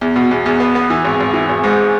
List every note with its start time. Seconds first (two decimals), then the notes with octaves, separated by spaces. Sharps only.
0.01 E2
0.16 B2
0.31 E2
0.46 E2
0.60 B3
0.75 B3
0.90 E3
1.04 G#1
1.20 G#1
1.34 E3
1.49 G#1
1.63 G#2